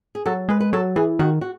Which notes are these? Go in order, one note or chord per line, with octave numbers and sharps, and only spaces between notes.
G#4
F#3 A4
G#3 B4
B4
F#3 A4
E3 G#4
D#3 F#4
F#4